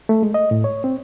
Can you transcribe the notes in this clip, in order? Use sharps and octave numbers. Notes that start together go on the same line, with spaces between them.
A3
G#3
D#5
A2
C#5
C4